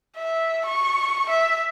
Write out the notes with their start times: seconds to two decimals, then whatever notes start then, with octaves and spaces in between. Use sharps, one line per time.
0.17 E5
0.66 C#6
1.29 E5